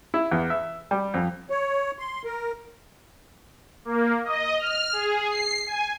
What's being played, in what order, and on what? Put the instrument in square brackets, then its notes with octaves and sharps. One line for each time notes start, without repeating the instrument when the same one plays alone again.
[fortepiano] E4
E2
E5
G3
F2
[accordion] C#5
C6
A#4
[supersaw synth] A#3
D#5
F6
G#4
C7
G#5